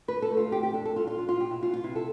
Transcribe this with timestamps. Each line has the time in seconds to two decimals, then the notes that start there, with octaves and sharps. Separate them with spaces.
0.08 D3 B4
0.22 A4
0.30 A3
0.37 F4
0.52 F2 G4
0.63 G4
0.74 D4 A4
0.86 A4
0.96 G3 F4
1.07 F4
1.18 D4 F4
1.29 F4
1.40 B2 G4
1.51 E4
1.61 B2 F4
1.74 F4
1.84 C3 E4
1.95 A4